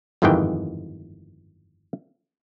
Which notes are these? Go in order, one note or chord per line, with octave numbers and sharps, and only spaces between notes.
G1 F2 G#2 D#3 E3 G5